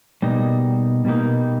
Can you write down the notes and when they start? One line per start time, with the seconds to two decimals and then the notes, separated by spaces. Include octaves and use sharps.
0.22 B2 G3 A#3 D#4
1.05 B2 G3 A#3 D#4